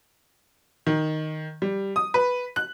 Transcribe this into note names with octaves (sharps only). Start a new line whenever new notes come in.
D#3
G3
D#6
B4
F#6